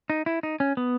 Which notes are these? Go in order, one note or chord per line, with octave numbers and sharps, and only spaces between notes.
D#4
E4
D#4
C#4
B3